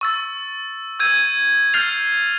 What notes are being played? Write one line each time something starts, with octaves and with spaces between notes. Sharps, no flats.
C#6 E6 A6
E6 G6 G#6 D#7
F6 G6 A6 C7 F7